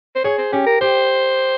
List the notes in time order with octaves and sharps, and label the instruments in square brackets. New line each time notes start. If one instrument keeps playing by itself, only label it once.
[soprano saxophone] C5
[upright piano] G#4 [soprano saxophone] C#5
[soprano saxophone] C5
[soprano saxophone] C#4 [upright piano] G4
[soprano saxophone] A#4
[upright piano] G4 [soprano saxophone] C5